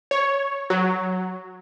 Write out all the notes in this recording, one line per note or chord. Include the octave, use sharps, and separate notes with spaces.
C#5
F#3